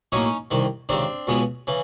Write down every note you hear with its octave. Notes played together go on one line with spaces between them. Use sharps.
A2 F#3 A#3 C#4 D#4
C2 C3 D#3
C#2 C3 D#3 C4 D4
C#2 B2 G#3 B3
C#3 E3